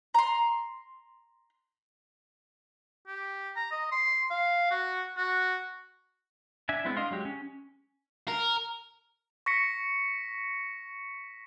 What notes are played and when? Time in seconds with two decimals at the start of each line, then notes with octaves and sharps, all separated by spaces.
0.14 A#5 C6
3.07 G4
3.56 A#5
3.71 D#5
3.91 C6
4.30 F5
4.71 F#4
5.17 F#4
6.69 D4 E5 G#5
6.85 G#3 B3 C4 E4
6.97 D4 D#5 F5 C6
7.11 F#3 G#3 G4
7.25 C#4
8.28 A#4
9.46 C#6 A#6 B6 C#7